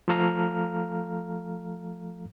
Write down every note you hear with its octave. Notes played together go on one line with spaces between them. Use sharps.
F3 A3 A4 F5 A#5 F6